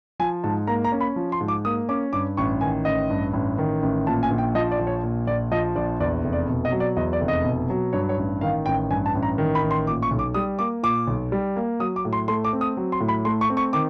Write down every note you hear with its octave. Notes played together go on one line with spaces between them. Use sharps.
F3 G#5
G#2 A5
A#3 A#5
A#5
C#4
B5
F3
C6
G#2
D6
A#3 D#6
C#4 D6
G2 D6
A1 C#6
D#3 G#5
A1 D#5
G2
A1
D#3
A1
A#2 A5
G#5
A#1
G5
F3 D#5
D5
A#1
C#5
A#2
A#1 D5
F3 D#5
A#1 D5
E2 D5
F1
D5
B2
D#5
F#3
D5
E2 D#5
D5
F1
D#5
B2
F#3
G2 C#5
C#5
A1
D#3 F5
A1 G5
G2 G#5
A5
A1
A#5
D#3
B5
A1
C6
A#2 D6
C#6
B1
D6
G3 D#6
A#3 D6
A#2 D6
B1
G3
A#3
F#3 D#6
D6
A2
C6
A3 C6
D6
C4
D#6
F#3
C6
A2
B5
A3 C6
C#6
C4
C#6
D#3 D6